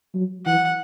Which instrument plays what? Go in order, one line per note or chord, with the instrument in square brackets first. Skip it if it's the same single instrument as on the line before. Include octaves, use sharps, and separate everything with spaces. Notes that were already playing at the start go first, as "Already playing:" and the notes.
[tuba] F#3
[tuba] E3 [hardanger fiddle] F#5